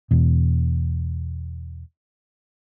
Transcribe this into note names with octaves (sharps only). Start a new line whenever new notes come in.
E2 B2